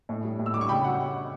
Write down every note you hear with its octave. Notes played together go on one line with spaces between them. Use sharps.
A2
G3
A2
E6
G3 D6
C#6
C#3 G5 B5
F#3 F#5